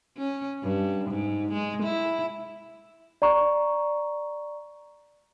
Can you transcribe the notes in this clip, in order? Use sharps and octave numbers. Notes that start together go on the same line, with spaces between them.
C#4
G2
G#2
G#3
E4
D5 A#5 C#6